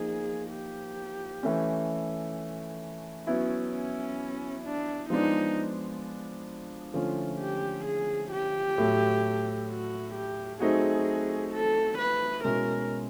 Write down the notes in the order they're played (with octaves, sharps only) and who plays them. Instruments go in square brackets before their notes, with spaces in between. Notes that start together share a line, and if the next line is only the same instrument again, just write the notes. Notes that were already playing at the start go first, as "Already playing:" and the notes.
Already playing: [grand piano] F3 A#3 D#4 [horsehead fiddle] G#4
[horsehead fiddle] G4
[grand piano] E3 A3 C#4
[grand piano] F#3 B3 E4 [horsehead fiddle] C#4
[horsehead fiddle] C#4
D4
[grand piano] F3 G#3 B3 D4 [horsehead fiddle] D#4
[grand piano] D3 F3 A3 C#4 E4 [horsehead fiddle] F4
[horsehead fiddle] G4
G#4
G4
[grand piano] A2 F#3 A3
[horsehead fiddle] F#4
G4
[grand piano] F#3 A3 C4 D#4 F#4 [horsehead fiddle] G#4
[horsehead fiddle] A4
B4
[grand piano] B2 G#3 C#4 E4 [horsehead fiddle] A#4